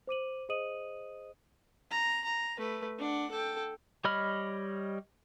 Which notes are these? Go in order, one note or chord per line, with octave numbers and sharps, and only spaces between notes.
C5 D6 D#7 F#7
G#4 C5 D#5 D#6 D#7 F#7
A#5
A#5
A3 B4
D4 F#5
A4 G5
G3 C#5 D#5 B5 F6